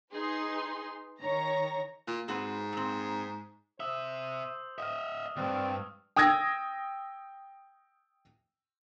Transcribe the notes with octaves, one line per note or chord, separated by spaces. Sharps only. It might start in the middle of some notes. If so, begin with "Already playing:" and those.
D#4 G#4 B4 C6
D#3 C#5 A#5 A#6
A#2 A#3
G#2 C4 F#4 B4
A#2 C4
C3 C5 E5 D#6 E6
D#5 E5 D#6 F6
D2 G2 C4 D5
G5 D#6 E6 G#6 A#6